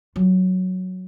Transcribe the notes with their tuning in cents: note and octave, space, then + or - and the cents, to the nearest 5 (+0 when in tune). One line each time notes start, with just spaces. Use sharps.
F#3 +0 F4 +15